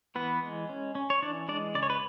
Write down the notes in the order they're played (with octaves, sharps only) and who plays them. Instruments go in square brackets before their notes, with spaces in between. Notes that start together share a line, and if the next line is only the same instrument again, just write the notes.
[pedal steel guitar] E3 B3 B4
G#3
C#4
C#4
C#5
E3 D4 D5
G#3 D4 D5
C#3 D5
C#5
B4